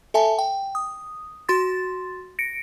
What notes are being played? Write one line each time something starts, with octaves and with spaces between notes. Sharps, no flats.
A4 E5 G#5 A5
G5
D#6
F#4 C6 A6
A#6 C#7 D7